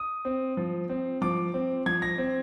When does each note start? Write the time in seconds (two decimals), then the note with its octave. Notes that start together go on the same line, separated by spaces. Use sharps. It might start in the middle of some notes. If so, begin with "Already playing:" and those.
Already playing: D#6
0.25 C4
0.57 F3
0.90 C4
1.22 F3 D6
1.54 C4
1.86 F3 G#6
2.02 A#6
2.18 C4